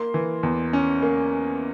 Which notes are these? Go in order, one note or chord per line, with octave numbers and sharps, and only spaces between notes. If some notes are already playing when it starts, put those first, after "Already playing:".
Already playing: A#3 C6
E3
E2
C#4
A#3